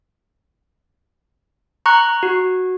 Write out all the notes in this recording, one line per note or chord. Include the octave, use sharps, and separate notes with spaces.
A#5 C#6 F#6
F#4